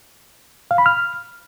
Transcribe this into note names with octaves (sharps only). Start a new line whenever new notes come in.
F5
B5
F6